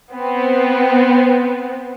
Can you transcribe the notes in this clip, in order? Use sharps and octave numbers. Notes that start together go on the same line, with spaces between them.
B3 C4